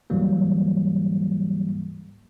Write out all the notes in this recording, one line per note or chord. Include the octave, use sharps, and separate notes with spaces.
D2 G#2 E3 F#3 G3 A#3